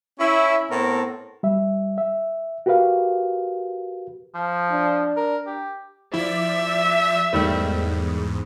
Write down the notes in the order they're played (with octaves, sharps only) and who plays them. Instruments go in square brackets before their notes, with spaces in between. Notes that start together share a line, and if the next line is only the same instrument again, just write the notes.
[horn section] C#4 E4
A2 B3 C4 A4 A#4
[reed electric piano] G3 E5
E5
F#4 G4 A#4 B4 F5
[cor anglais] F3
[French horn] D4
[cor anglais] A#4
G4
[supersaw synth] F3 D5 [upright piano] E4 [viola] E5
[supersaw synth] E2 G#2 [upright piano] D#3 G3 A3